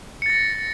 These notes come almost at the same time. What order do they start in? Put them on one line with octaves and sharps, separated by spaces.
C#7 A6 A#6